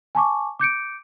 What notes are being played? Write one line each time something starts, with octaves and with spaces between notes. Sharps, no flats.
G#5 A5 C#6 D6
D6 G6 C#7 D7